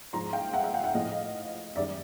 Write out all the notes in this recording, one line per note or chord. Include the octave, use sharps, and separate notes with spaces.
G#2 F3 G#3 A#5 C6
F5 G5
E5 F#5
E5 F#5
F5 G5
E5 F#5
A2 F3 A3 D#5 F5
F#2 D#3 G3 D5 E5